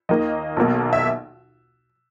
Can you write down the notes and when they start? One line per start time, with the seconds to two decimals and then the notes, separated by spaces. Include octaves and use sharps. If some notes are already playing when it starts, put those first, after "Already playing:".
0.09 D#2 D#3 A#3 D#5
0.57 B1 B2 A#3
0.93 E5